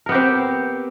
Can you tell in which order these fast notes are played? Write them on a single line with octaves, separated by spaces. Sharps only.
A#4 B3 G4 C4